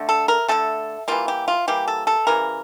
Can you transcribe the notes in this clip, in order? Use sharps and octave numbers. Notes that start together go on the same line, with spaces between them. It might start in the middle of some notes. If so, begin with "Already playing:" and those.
Already playing: D3 A3
A4
A#4
D3 A3 A4
E3 G3 A#3 F4
G4
F4
E3 G3 A#3 G4
A4
A4
C#3 E3 G3 A#4